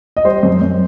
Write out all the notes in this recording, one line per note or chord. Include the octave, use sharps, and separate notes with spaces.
D#5
G3 C5
F#2
F#2